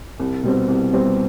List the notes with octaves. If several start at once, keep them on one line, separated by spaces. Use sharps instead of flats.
C2
B2 G3 C4
C2
B2 G3 C4